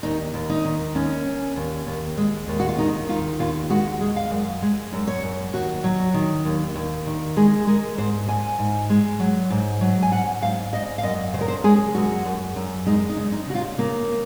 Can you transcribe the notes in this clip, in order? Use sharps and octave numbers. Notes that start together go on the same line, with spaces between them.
D#2 D#4
D#2
D#4
D#3
D#2 C#4
D#2
D#2
D#2
G#3
D#2
F#4
F4
D#3 D#4
D#3 F4
D#2 F4
G#3 F#4
G#3
F5
F#2
G#3
F#2
C#5
F#2
D#2 F#4
F#3
D#3
D#2
D#2
D#3
G#3 G#4
G#3 A#4
G#2 C5
G#2 G#5
G#2
G#3
F#3
G#2
F#3
G#5
G#2 F#5
G#2 F5
G#2 D#5
F5
F#2 D#5
C#3 C5
A#4
C5
G#3 G#4
F#2 F#4
F#2
F#2
G#3 D#4
D#4
C#3
D#4
C#3 F#4
F4
C#3 A#3